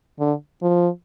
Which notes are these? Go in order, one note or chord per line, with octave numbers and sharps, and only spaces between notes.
D3
F3